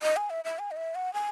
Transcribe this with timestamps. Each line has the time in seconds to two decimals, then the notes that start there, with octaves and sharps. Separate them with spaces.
0.03 D#5
0.16 G#5
0.30 E5
0.45 E5
0.59 G#5
0.71 D#5
0.77 E5
0.95 F#5
1.14 G#5